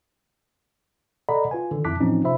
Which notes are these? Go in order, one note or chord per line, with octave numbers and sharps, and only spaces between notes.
A4 D5 D#5 F#5 A#5 B5
F4 B4 G#5
D3 D#3
F2 E4 A5 D6 F#6 B6
A2 E3 F3 C4 C#4 D#4
C3 F4 C5 E5 B5